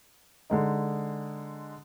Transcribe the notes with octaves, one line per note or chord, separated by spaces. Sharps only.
D3 G#3 D#4